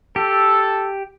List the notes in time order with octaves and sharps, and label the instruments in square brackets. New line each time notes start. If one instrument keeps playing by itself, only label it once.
[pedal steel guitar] G4 [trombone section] A4